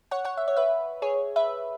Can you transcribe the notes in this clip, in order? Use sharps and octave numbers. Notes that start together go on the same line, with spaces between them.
C#5 F#5
C#5 F#5
E5
C#5
B4 E5
G#4 C#5
B4 E5